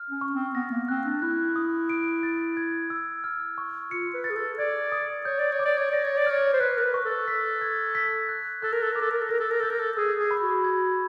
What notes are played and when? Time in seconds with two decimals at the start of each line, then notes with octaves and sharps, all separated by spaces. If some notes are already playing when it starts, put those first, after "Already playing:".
Already playing: F6
0.10 C#4
0.21 C#6
0.32 C4
0.55 B3 A#6
0.71 A#3
0.88 C4 F#6
1.05 D4
1.22 E4 F#6
1.56 D#6
1.90 D7
2.23 A6
2.57 G#6
2.90 E6
3.24 F6
3.58 C#6
3.91 F4 C#7
4.14 B4
4.24 A6
4.30 G#4
4.35 A4
4.58 D5 G#6
4.92 D#6
5.25 C#5 G6
5.39 D5
5.52 C#5
5.59 D6
5.65 D5
5.78 C#5
5.91 D5 A#6
6.04 C#5
6.17 D5
6.26 C#5 F6
6.53 C5
6.60 B4 F#6
6.77 A#4
6.83 B4
6.94 C#6
7.05 A4
7.28 B6
7.61 G#6
7.95 B6
8.29 F#6
8.62 A4 F#6
8.72 A#4
8.81 A4
8.92 A#4 D6
9.01 A4
9.10 A#4
9.21 A4
9.29 A#4 A#6
9.40 A4
9.50 A#4
9.60 A4 G6
9.69 A#4
9.79 A4
9.97 G#4 E6
10.19 G#4
10.31 B5
10.41 F#4
10.64 G#6